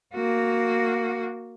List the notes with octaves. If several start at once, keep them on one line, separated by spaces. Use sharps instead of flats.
A#3 F#4